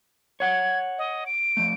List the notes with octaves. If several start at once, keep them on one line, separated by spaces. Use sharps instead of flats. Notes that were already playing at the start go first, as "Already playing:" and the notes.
C#5 F#5 G#6
D#5
D7
F3 A3